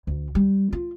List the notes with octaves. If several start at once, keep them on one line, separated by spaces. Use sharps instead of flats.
D2
G3
F4